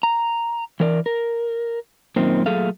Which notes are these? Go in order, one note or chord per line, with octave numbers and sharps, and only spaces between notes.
A#5
E3 A#4 D5
A#4
F#2 A#2 D#3 C4
A#2 F#3 A3 G#4 A4 F5